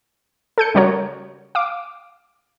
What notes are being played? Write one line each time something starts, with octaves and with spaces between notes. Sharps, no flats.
A4 G6 C#7
C#3 G3 F#4 A#4 C#5
F5 D6